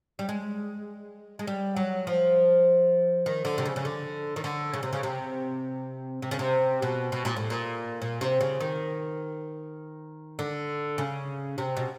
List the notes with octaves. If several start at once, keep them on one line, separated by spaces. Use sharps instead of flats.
G3
G#3
G#3
G3
F#3
F3
D#3
D3
C3
C#3
C#3
D3
D#3
D3
C#3
C3
C#3
C3
C3
C#3
C3
B2
B2
A#2
A2
A#2
A#2
C3
C#3
D#3
D3
C#3
C3
B2